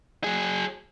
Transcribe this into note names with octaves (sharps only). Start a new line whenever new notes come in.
F#3 G#4